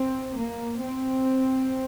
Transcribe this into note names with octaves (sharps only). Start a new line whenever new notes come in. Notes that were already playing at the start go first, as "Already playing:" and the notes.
Already playing: C4
A#3
C4